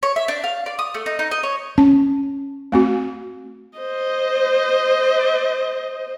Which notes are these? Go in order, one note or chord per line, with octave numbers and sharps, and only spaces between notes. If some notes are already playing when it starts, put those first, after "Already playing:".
C#5
E5
D4
F5
D5
D#6
A3
D#4
D#4
D#5
C#5
C#4 A5
A3 C4 F#4
C5 D#5